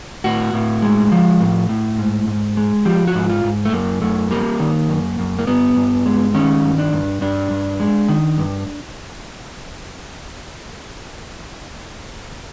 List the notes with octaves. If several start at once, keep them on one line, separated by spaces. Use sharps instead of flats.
A2 F#4
A2
G#3
F3
A2
A2
G#2
G#2
G#3
F3 G4
F#4
G#2
F4
G#2
A3
F#2 A#3
F#2 A3
G3 A#3
D#3
F#2
F#2
A#3
G2 B3
G2
G#3
D#3 C#4
G2
D4
G2
G2 D4
G2
G#3
D#3
G2